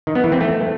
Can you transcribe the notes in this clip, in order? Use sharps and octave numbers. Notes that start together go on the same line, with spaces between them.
D#3
B3
E3
C4
A3